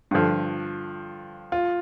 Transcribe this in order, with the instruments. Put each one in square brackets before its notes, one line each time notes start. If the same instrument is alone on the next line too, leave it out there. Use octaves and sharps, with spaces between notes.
[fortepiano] G2 D3 F3 [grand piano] F4
[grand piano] F4